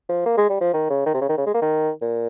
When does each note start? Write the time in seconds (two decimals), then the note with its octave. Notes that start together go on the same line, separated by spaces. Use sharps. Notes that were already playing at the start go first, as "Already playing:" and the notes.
0.09 F3
0.26 A#3
0.37 G#3
0.49 G3
0.61 F3
0.73 D#3
0.90 C#3
1.06 D#3
1.14 C3
1.21 C#3
1.29 D#3
1.37 C#3
1.46 G#3
1.54 A#3
1.62 D#3
2.02 A#2